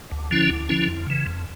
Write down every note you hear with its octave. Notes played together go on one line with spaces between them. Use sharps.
D2
D3 F3 C#4 E4
D2
D3 F3 C#4 E4
F2
C#3 E3
F2